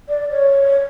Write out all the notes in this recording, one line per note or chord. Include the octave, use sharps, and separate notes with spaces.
D5
C#5